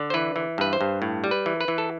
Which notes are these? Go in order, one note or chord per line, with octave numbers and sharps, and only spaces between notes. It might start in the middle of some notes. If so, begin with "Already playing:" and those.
Already playing: D3
C5
E3 B4
E3
G2 B4
C5
G2
A2
G3
B4
E3
B4
E3
A4